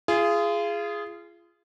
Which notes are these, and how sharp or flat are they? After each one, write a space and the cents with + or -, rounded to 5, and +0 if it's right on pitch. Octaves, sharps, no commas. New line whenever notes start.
F4 -30 G#4 +0